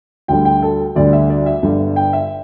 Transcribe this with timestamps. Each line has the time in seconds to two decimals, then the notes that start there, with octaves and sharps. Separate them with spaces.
0.28 D2 D3 G3 G5
0.45 G5
0.62 A4
0.96 D2 D3 G3 D5
1.13 E5
1.30 D5
1.46 E5
1.63 G1 G2 D3 G3
1.96 G5
2.13 E5